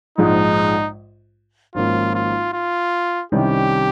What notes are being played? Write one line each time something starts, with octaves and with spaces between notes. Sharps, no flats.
A#1 G#2 F3 G#3 D#4
G#1 G#2 F3 A#3 C#4 F4
F4
F4
C2 C3 D#3 G3 C#4 G4